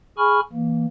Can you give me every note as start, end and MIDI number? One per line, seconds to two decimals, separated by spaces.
0.18 0.40 68
0.18 0.40 80
0.18 0.40 83
0.18 0.40 85
0.18 0.40 89
0.53 0.86 52
0.53 0.86 58